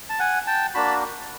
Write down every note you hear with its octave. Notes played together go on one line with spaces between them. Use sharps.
A5
F#5 G#5
G5 A5
A#3 D4 F#4 A5 B5